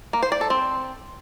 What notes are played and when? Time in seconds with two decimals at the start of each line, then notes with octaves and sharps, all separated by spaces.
0.13 A#3
0.23 C5
0.32 D5
0.41 A4
0.50 C4